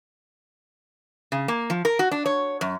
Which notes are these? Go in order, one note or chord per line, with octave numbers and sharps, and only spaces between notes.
C#3
A#3
F3
A#4
F#4
D4
C#5
F#2